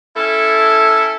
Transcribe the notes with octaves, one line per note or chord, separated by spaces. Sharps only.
C#4 E4 A4